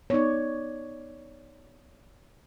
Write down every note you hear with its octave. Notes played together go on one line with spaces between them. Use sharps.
B3 D#4 C#5 D5